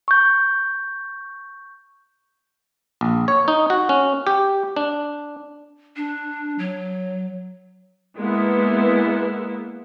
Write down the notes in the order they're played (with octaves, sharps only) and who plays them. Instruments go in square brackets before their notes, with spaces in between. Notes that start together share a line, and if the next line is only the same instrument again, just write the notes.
[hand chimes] C#6 G6
[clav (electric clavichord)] A#1
C#5
D#4
F#4
C#4
G4
D4
[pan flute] D4
F#3
[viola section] G#3 A#3 B3 E4